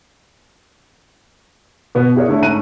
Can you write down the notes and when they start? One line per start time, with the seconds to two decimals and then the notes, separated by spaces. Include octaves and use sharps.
1.95 B2 B3
2.16 E4 G#4 A#4 C#5 D5
2.28 D3 A3 E4 C#5
2.42 G#2 A3 C#4 A#5 F#6 D#7